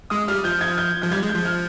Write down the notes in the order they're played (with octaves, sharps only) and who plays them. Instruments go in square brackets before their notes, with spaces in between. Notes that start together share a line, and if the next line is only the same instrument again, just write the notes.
[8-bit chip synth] G#3 [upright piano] D#6
[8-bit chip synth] G3 [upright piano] F6
[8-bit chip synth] F3 [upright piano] G6
[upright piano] G#6
G6
[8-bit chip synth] F3 [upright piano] G6
[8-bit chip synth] G3 [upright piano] G#6
[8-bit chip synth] G#3
[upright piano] G6
[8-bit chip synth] F3
[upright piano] F6